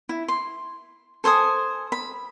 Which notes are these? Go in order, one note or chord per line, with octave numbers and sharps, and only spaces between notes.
E4
C6
A4 C5 G#5 D#6
B5